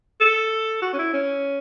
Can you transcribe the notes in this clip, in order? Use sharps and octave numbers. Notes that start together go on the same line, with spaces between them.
A4
F#4
C#4
E4
C#4